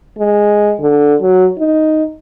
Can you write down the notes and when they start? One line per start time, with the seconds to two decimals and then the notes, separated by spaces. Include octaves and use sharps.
0.19 G#3
0.80 D3
1.22 F#3
1.58 D#4